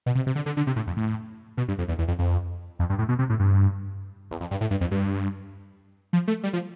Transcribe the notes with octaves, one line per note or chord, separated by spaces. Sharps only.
B2
C3
C3
D3
D3
D3
C3
A2
F2
A2
B2
G2
F2
E2
E2
F2
F2
F2
G2
A2
B2
C3
A2
G2
E2
F2
G2
A2
G2
F2
G2
F3
A3
G3
F3